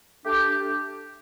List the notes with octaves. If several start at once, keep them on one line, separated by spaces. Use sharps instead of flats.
A3 D4 G4